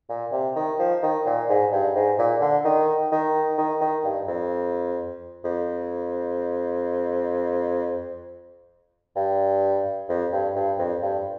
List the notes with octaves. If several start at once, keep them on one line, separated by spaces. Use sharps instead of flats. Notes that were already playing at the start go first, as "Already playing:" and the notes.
A#2
C3
D#3
F3
D#3
A#2
G#2
G2
G#2
A#2
D3
D#3
D#3
D#3
D#3
G2
F2
F2
G2
F2
G2
G2
F2
G2